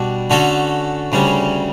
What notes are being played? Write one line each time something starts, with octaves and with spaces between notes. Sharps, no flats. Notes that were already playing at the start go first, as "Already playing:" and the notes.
Already playing: B2 G3 D4 F#4
D3 A3 C#4 F#4 A4
D2 C#3 G3 C#4